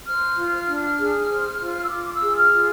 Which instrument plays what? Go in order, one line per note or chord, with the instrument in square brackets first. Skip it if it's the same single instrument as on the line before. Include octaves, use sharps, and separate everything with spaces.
[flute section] C5 F6
F4
F6
D4
G#4
C5
F4
E6
F4 D6
D6
E6
G#4
F6
F4